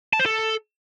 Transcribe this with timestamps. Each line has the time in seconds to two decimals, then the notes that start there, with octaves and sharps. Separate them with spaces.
0.13 A5
0.19 C5
0.26 A4